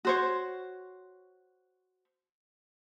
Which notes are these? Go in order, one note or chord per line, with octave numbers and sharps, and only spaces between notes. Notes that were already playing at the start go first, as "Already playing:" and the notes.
F#4 C5 C#5